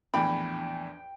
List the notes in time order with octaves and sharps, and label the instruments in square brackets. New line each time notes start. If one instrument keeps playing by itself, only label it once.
[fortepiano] A#1 E2 A2 [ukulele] D4 B5 [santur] G5